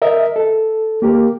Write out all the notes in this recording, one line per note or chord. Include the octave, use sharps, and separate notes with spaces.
A#4 D#5 E5
A4
A#3 G4 A#4